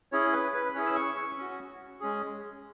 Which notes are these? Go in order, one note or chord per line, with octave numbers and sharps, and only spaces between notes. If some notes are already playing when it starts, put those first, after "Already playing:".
C#4 E4 G#4 C#5
B4
B4
C#4 E4 G#4 C#5
E6
C#6
C#6
C#4 F#4
G#3 C#4 G#4